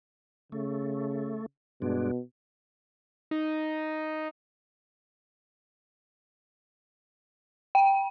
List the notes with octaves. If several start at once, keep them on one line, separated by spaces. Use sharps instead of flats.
C#3 A3
G2 B2 G#3 D4
D#4
G5